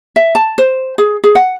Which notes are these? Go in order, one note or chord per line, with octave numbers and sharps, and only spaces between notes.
E5
A5
C5
G#4
G#4
F#5